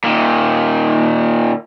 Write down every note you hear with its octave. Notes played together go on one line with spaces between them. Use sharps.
A#2 D#3